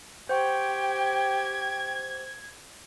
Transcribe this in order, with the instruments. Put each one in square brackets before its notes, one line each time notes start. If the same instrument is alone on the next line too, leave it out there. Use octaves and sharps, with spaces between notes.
[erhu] G4 [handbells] C5 F#5 C#6 [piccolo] G5 [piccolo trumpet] G#6